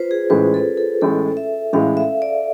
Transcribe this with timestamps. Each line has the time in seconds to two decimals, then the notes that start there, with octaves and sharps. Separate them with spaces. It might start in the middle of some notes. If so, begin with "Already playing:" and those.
Already playing: F4 B4 C5
0.11 G#4
0.30 A1 A2 G#3 B4
0.54 A4
0.77 A4
1.01 A1 A2 G#3 A4
1.37 E5
1.73 A1 A2 G#3 F5
1.97 E5
2.22 D5